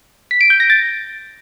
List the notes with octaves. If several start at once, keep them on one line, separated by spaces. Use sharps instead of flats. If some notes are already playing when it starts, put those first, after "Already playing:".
B6
D7
G6
A#6
A6